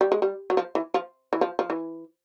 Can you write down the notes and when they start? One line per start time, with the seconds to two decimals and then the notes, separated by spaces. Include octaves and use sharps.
0.01 G3
0.12 G#3
0.22 G3
0.50 F#3
0.57 F3
0.75 E3
0.94 F3
1.33 E3
1.41 F3
1.59 F3
1.70 E3